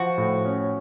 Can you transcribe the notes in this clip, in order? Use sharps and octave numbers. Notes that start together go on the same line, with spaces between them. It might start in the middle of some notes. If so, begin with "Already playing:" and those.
Already playing: F3 F#4
A2
C#4